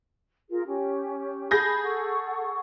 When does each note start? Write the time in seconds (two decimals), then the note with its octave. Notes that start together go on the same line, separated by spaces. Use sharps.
0.50 F4 G#4 A#4
0.67 C#4 G4
1.51 G#4 A5 B5 G6 A#6
1.83 A4 F#5 C#6